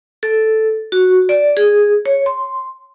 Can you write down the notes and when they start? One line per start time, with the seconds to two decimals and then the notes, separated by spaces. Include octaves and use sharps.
0.23 A4
0.92 F#4
1.29 D5
1.57 G#4
2.06 C#5
2.26 C6